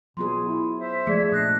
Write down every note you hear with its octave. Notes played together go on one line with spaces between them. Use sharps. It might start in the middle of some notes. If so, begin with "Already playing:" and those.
B2 F#3 B3 F4 G#4 C6
E4
C5 E5
F3 G#3 A3 G#4 D5 G#6
A#2 D4 D#6 F#6 A#6 C7